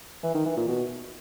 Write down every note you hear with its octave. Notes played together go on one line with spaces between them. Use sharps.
E3
D#3
E3
A#2
B2